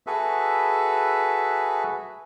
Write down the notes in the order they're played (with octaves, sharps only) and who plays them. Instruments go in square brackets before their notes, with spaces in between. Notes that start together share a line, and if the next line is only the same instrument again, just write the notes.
[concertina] F#4 G#4 A4 B4 E5